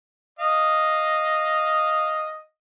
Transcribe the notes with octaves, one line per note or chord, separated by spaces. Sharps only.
D#5 F5